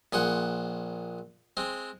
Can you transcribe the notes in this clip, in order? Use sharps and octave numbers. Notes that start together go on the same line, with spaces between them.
A#1 G#4 C5 F#5
G#3 C4